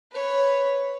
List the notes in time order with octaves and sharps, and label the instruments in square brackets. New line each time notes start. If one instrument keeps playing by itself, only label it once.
[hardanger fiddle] B4 C#5